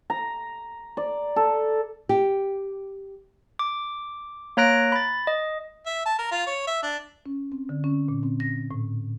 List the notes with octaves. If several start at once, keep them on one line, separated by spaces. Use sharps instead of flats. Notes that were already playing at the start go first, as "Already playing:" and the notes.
A#5
D5
A4
G4
D6
A#3 C#5 A#5 F#6 A#6 D7
B5 A6
D#5
E5
A5
A#4
F4
C#5
E5
D4
C#4
C4
D3
C#4
A#2
C4
A#6
A2